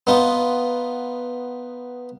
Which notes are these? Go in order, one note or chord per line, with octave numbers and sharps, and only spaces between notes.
B3 D#4 F4